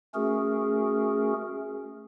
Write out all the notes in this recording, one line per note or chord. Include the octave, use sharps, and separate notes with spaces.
A3 C#4 F#4 G#4 A#4